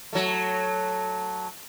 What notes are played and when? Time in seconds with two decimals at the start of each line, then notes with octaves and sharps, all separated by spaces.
0.13 F#3 A3